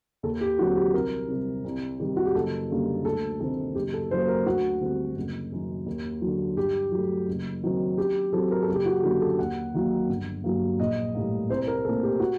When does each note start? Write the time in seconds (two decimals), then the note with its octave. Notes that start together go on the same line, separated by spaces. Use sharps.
0.23 D#2 A4
0.41 G4
0.59 D3 F#3 C4 F#4
0.76 G4
0.94 C2 A#4
1.29 C3 G3
1.64 C2
2.00 C3 D#3 G3
2.17 F#4
2.26 G4
2.35 F#1 A4
2.70 F#2 D3 G3 A#3
3.05 D2 A4
3.40 C3 D#3 A3 C4 A4
3.75 F#1 G4
3.93 A4
4.11 F#2 F#3 A#3 C5
4.28 A#4
4.46 D2 F#4
4.81 D3 G3 C4
5.16 F#1
5.52 F#2 D#3
5.86 D#2
6.21 F#3
6.27 D3
6.57 G2 G4
6.92 F#3 A3
7.28 F#1
7.63 F#2 D#3 F#3 C4
7.98 F#2 G4
8.33 F#3 C4 A4
8.51 A#4
8.62 A4
8.68 F#1
8.74 G4
8.86 F#4
9.03 F#2 D3 F#3 A#3 G4
9.21 A4
9.39 D#2 F#5
9.74 D#3 F#3 A#3
10.09 G1
10.44 G2 F#3 A#3
10.80 A#1 D#5
11.15 A2 G3 A#3
11.49 C2 C5
11.67 A#4
11.84 A#2 A3 C4 A4
12.03 G4
12.20 F#4